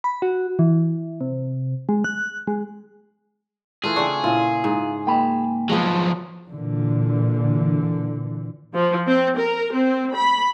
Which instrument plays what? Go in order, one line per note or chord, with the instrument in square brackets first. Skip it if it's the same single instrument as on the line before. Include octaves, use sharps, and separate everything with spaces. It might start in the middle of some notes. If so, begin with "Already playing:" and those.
[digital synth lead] B5
F#4
E3
C3
G#3
F#6
G#3
[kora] E3 A3 F4 [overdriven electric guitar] G#4
[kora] C#3 C4 D4 [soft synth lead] C#6
[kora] A#2 C#4 [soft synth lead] E4 [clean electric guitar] F4
[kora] G#2
[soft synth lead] A#3 [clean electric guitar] G5 G#5 B5
[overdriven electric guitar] F3 F#3 [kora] G#3 B3
[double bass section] A#2 D3 E3
[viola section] F3
C4
A#4
C4
B5